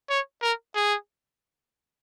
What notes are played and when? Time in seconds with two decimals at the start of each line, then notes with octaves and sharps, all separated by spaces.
0.10 C#5
0.42 A#4
0.75 G#4